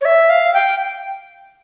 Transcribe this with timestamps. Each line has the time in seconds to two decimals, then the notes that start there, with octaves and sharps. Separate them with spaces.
0.01 C#5
0.05 E5
0.29 F5
0.54 G5